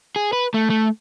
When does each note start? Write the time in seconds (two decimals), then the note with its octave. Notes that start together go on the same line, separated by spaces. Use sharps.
0.16 G#4
0.33 B4
0.54 A3
0.70 A3